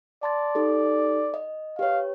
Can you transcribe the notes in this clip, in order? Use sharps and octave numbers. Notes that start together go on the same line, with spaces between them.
D5 A5 C6 A6
D#4 G4 A4
D#5
G4 B4 C#5 F5